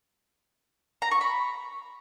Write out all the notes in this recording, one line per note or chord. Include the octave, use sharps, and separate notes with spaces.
A#5
C#6
B5